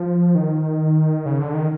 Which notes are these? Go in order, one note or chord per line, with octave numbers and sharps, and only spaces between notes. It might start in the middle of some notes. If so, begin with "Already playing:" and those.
Already playing: F3
D#3
C#3
D3
D#3